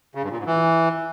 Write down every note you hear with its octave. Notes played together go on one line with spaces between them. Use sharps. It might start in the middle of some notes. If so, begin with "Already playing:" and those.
C#3
G2
A#2
G#2
E3